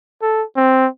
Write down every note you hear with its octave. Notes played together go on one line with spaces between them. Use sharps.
A4
C4